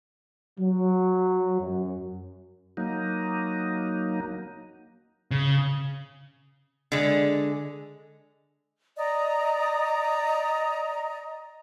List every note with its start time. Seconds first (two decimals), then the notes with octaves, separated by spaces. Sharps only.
0.59 F#3
1.61 F#2
2.77 F#3 A#3 D#4
5.31 C#3
6.92 D3 G#3
8.97 D5 D#5 A#5